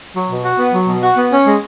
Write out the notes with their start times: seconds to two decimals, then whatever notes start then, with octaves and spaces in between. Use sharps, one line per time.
0.14 F#3
0.29 B2
0.43 F#4
0.57 B3
0.73 F#3
0.88 B2
1.02 F#4
1.16 B3
1.31 C#4
1.47 G#3